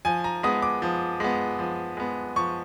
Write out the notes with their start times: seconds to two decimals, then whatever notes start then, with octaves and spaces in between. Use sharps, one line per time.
0.05 F3 G#5
0.24 A#5
0.43 G#3 B3 D#6
0.62 D6
0.82 F3
1.20 G#3 B3
1.59 F3
1.97 G#3 B3
2.36 F3 C#6